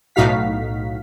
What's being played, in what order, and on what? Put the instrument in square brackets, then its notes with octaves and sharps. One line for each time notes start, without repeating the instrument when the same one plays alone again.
[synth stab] B1 A2 D#4 F#4 F5 B6